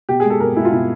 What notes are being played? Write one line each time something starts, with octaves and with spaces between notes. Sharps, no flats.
B2 G4
G#3 G#4
A4
B2 A#4
G#3 E4
F4
B2 E4